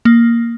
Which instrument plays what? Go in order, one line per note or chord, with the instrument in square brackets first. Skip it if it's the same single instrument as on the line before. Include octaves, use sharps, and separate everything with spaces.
[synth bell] A#3